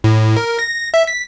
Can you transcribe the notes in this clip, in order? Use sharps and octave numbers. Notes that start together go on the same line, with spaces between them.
A2
A#4
A#6
E5
B6